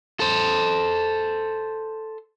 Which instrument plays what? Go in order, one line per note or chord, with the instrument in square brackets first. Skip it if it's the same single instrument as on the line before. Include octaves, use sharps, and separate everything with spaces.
[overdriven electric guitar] A4 C5